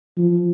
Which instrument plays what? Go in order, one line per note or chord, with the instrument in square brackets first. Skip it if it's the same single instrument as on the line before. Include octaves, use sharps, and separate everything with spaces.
[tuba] F3